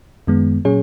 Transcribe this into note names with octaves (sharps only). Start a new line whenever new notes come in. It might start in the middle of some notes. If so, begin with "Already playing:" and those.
F#2 D#3 G#3 B3
A#2 F#3 C#4 G#4 C#5